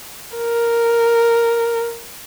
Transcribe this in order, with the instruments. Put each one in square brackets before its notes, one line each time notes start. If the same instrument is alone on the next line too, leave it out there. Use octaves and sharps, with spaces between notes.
[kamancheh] A#4